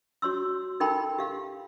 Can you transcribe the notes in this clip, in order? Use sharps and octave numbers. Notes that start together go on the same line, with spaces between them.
F#4 C#5 C6 E6
D#4 A4 A#4 G5 B5 C6
G4 F5